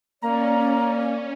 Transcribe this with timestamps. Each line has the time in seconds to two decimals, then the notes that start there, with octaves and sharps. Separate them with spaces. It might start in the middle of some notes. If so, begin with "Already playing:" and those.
0.22 A#3 C#4 D5 A#5